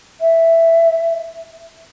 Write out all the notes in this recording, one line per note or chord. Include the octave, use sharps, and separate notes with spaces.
E5